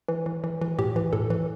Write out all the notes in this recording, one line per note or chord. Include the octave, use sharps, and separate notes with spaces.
E3
E3
E3
E3
A2 G4
E3
A2 A4
E3